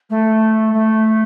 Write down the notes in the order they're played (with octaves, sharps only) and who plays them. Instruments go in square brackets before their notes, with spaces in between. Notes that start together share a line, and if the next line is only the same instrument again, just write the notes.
[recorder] A3
A3